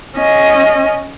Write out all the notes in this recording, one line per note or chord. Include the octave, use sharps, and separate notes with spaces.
C#4 D#5